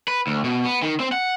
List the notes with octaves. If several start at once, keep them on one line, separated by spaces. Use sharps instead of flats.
B4
D2
B2
B3
D#3
C4
F#5